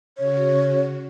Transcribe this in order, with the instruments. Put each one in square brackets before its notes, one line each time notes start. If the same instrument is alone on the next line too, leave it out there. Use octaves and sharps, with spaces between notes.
[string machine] C#3 F#4 [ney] C#5